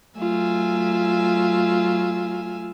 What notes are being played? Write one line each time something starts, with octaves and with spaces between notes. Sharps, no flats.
F#3 A3 F4 G#5 E6